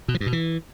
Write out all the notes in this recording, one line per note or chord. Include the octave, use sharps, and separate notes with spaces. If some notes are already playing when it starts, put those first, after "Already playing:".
B2
F3
G2
B2
E3